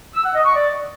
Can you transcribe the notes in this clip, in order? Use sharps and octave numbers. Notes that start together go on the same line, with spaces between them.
E6
F#5
D#5
C#6
D5